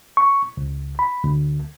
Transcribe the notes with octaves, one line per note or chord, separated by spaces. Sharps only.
C#6
C#2
B5
D2